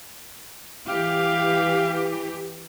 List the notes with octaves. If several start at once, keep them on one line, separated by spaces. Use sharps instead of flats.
E3 G4 F5